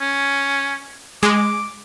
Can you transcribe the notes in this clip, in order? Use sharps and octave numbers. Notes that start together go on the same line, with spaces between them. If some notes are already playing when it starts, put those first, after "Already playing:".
C#4
G#3 D6